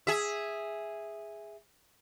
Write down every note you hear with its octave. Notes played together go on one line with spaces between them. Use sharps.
G#4 E5